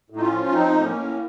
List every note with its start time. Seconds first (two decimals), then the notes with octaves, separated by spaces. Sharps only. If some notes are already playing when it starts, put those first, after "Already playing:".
0.10 A2
0.16 D#4
0.20 C#4 F4
0.32 F3
0.52 F3 C4 D#4
0.74 A2 C4
0.84 A#3 C#4
0.95 A2